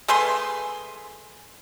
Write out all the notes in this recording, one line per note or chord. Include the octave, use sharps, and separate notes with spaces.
A3 G#4 B4 C6